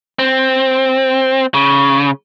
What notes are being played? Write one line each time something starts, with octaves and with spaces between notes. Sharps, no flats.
C4
C#3